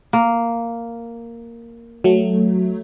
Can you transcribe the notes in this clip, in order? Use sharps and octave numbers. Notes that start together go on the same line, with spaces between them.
A#3
F#3 A3